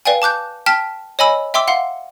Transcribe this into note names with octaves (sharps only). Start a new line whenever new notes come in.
B4 D5 F5 G5 G#5
A5 D6 F#6 G6
G5 A5 F6 B6
C#5 D#5 G#5 B5 E6
E5 G5 C6 D6 E6
F5 F#5 C6